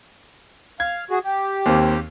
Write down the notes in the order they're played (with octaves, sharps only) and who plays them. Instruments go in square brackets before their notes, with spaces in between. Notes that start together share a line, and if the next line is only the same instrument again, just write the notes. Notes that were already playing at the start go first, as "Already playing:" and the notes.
[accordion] F5 [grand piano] G#6
[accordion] F#4 G#4
G4
[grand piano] D#2 A#3 C4